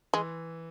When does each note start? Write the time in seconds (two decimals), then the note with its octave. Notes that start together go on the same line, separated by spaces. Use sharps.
0.14 E3 G#3